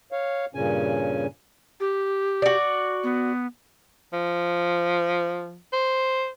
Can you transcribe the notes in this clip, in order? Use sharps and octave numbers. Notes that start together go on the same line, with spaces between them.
C#5 F5
G2 A#2 C#3 C#4 G#5
G4
F#4 D5
B3
F3
C5